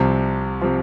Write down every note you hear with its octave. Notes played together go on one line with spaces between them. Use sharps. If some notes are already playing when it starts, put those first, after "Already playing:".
Already playing: C2 C3 F3
C3 F3